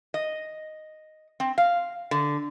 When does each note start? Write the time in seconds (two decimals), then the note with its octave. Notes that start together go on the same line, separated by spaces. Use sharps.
0.14 D#5
1.40 C4
1.58 F5
2.11 D3